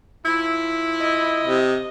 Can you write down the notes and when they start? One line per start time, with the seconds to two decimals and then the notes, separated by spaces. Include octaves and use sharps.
0.24 F3 E4
1.01 D#5
1.44 C3